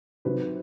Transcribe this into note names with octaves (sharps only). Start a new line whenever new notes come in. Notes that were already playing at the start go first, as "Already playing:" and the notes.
C3 D#3 F#3 B4